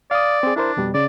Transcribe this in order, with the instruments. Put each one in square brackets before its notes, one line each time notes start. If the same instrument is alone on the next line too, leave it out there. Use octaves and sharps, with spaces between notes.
[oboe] D5 [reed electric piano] F5 D#6
[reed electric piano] C4 G#4
[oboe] D4 [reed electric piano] E4 A#4 C5
[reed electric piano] F2 B2 G3
[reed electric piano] C#3 [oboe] D5